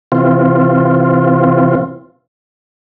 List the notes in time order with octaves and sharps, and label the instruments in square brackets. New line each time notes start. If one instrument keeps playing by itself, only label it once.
[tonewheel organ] C3 E3 C4 F4